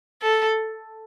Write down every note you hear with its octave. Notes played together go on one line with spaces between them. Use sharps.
A4